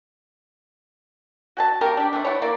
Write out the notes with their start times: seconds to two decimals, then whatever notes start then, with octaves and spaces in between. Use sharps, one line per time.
1.57 F#4 G#5 A5
1.81 A#3 C#4 G4 A#4
1.97 D4 G4
2.13 C3 A3 D4
2.25 A3 B3 E4 C#5
2.42 A#3 E4 D5